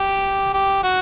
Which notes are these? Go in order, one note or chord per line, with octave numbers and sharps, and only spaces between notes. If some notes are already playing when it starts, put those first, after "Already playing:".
Already playing: G4
G4
F#4